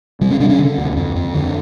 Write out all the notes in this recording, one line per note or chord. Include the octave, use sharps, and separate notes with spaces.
C3 G3
C#4
C3 D4
C#4
D3
D#2
F2
F2
D3